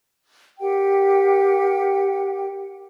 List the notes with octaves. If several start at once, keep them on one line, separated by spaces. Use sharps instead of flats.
G4 A#4 F#5 G5